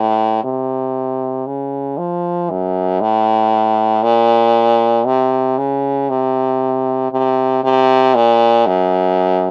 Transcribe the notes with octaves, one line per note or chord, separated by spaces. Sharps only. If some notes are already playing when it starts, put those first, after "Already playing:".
Already playing: A2
C3
C#3
F3
F#2
A2
A#2
C3
C#3
C3
C3
C3
A#2
F#2